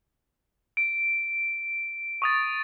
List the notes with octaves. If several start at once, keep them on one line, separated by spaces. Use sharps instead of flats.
D7
C#6 D#6 A6